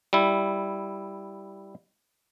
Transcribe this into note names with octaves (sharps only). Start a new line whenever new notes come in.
G3 E4